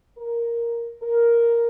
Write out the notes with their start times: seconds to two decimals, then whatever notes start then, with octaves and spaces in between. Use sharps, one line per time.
0.18 A#4
1.02 A#4